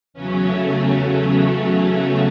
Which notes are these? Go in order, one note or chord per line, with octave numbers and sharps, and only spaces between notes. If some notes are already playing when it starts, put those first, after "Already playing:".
E2 C#3 F#3 C#4
A3
A3
C#4